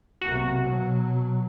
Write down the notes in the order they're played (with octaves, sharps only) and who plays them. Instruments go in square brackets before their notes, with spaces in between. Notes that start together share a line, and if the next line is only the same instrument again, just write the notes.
[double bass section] B1 C3 A#3 [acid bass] F#4
[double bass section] B2 F#3